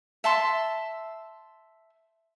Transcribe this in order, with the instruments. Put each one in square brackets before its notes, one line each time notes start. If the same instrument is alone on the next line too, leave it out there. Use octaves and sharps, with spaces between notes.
[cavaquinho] E5 A5 C6